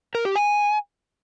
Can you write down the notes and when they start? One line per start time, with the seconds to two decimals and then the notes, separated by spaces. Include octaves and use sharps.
0.15 A#4
0.25 G4
0.36 G#5